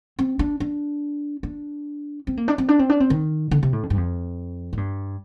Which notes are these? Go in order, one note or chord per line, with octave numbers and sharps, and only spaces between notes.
C4
D4
D4
D4
C4
A#3
D4
C4
D4
C4
D4
C4
D#3
D3
C3
A2
F2
G2
F2
A2
G2